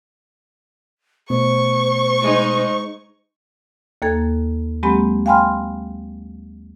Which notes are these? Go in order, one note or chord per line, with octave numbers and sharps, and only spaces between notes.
B2 A3 B3 C5 C#6
G#3 D#4
D#2 A#3 A4 G#6
F#3 G#3 A#3 C4 G4 B5
F5 G5 G#5 B5 C6 F6